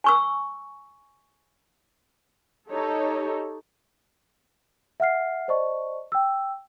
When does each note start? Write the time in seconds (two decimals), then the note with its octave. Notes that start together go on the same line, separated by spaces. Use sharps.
0.04 G#5 C#6 E6
2.70 D#4 G4 A4 C#5
5.00 E5 F#5 F6 C7
5.48 C5 D5 D#5 A5 C#6
6.12 G5 E6